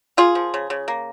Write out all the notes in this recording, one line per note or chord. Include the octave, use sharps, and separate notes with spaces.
A#3 F4 G#4
F3
C#3
C#3
A#3